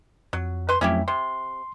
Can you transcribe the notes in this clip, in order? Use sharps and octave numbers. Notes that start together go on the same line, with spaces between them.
F2 F#3
B4 C6
F2 F#3 A3 C#4 E4 G4
C3 C6